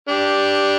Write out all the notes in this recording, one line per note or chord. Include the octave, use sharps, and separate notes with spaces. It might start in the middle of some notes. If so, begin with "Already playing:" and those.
D4 G4